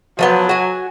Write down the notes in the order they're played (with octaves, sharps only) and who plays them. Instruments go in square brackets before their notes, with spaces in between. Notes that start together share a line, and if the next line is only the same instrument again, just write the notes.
[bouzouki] F3 A#3 B3 [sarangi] F#3
[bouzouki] F#4 G#5